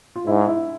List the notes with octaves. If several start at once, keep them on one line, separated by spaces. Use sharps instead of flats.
F4
G#2 E4
E4